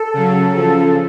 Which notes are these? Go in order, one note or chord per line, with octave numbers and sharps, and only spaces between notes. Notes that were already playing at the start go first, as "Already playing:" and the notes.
Already playing: A4
C#3 F#3
C#3 F3